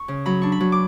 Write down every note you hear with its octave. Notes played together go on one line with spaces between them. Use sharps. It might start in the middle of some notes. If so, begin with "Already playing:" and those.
Already playing: C#6
C#3
F#3 B5
D4 C#6
B5
F#3
D6